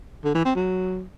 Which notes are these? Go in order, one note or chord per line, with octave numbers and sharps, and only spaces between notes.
D3
E3
C4
F#3